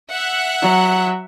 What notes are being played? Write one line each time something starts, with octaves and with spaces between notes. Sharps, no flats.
E5 F#5 F#6
F#3